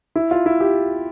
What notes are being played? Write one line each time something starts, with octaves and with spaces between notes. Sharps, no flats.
E4
F4
E4
G4